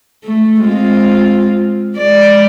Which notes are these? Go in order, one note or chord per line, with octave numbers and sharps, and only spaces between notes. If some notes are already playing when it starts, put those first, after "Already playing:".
A3
G#3 C4 F4
G#3 D5